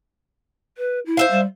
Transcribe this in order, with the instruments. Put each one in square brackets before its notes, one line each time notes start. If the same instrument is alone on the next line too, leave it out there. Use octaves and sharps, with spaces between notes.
[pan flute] B4
E4
[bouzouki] C5 E5 F5
[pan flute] G3